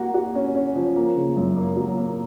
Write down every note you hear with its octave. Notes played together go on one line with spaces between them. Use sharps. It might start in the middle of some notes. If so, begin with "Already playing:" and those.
Already playing: A#3 F#4
F#4
C#4
C#4
F3
A#3
C#3
F#2
A#3
F#3
A#3